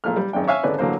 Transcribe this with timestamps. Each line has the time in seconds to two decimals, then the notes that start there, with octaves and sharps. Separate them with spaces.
0.04 A#1 A#2 A3 F6
0.16 G3
0.33 G#1 F#2 D4 G5
0.48 C#5 E5 F5 G#5
0.63 G#1 D3 C#4 D4 B4
0.78 A1 D3 F#3 A#3 C5